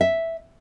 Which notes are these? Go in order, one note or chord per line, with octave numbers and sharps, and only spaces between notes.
E5